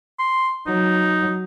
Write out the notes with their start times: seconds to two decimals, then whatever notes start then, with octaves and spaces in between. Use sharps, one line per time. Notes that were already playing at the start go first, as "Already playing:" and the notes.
0.19 C6
0.67 F#3 D#4